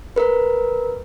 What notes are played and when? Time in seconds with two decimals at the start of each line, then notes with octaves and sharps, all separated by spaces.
0.16 A#4 B4